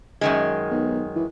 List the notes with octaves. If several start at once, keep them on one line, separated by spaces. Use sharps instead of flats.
F#2 D#3 G#3
B1
E3